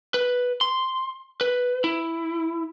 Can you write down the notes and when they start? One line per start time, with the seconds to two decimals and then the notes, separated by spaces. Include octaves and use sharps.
0.14 B4
0.61 C6
1.41 B4
1.84 E4